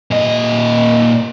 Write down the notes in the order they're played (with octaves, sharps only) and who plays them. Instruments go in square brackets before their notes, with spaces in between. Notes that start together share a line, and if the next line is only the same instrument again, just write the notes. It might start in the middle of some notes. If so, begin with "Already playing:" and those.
[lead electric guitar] A#2 D#5